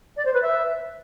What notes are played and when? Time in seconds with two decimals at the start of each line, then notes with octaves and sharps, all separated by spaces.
0.17 D5
0.25 C5
0.34 B4
0.42 E5